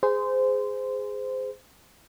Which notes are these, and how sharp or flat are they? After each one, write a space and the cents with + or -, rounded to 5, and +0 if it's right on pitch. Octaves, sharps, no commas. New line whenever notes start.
G#4 +0 C5 -20